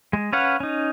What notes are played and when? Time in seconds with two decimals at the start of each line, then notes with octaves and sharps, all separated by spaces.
0.13 G#3
0.33 C#4 B4 C#5 F5 F#5
0.60 C#4 D#4